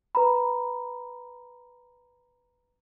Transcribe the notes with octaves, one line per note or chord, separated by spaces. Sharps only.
B4 A#5 B5